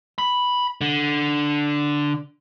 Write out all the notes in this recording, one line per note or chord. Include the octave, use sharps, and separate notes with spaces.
B5
D3